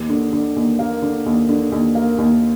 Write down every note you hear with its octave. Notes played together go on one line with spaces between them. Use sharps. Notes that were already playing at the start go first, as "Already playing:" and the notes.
Already playing: D#2
D3
D3
D#2
A#3
D3
D#2
D3
D#2
A#3
D#2